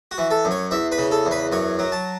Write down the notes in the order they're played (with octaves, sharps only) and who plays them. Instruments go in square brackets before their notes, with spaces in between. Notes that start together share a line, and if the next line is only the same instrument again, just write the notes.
[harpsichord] F#4
E3
A4
F#2
C#5
E2 E5
B4
C#3
A4
E2
B4
F#2 C#5
F#3
A5